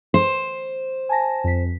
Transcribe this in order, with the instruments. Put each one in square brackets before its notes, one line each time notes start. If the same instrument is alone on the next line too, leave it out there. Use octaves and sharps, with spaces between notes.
[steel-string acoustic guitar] C5
[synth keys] G#5 A5 A#6
F2 B6